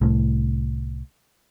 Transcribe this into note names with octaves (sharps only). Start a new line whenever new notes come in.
C2 A2